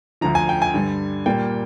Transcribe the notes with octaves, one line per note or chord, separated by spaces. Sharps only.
D2 D3 F3 A#5
G#5
G5
G#5
G2 D3 G3
A#2 G3 A#3 G5